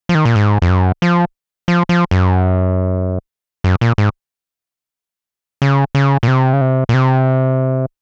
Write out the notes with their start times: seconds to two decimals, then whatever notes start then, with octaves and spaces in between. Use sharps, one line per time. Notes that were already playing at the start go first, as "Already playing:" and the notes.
0.09 F3
0.15 D#3
0.25 A#2
0.36 G#2
0.62 F2
0.69 F#2
1.02 F3
1.68 F3
1.89 F3
2.11 F#2
3.64 F#2
3.81 A#2
3.98 G#2
5.62 C#3
5.95 C#3
6.23 A#2
6.28 C3
6.53 C#3
6.61 C3
6.89 A#2
6.94 C3